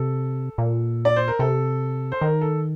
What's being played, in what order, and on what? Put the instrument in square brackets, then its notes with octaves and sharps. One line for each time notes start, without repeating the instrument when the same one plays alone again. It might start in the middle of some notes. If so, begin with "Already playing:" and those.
Already playing: [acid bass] C3 [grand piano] A4
[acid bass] A#2
[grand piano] D5
C5
A#4
[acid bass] C3 [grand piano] A4
[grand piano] C5
[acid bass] D#3 [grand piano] A#4
[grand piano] A4